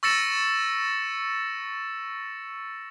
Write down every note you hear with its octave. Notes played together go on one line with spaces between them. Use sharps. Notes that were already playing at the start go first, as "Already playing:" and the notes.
C#6 E6 A6 A#6 C#7 E7